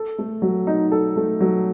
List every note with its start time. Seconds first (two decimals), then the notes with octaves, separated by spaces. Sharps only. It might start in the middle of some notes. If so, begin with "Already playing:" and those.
Already playing: A4
0.18 A3
0.42 F#3
0.67 D#4
0.92 A4
1.16 A3
1.40 F#3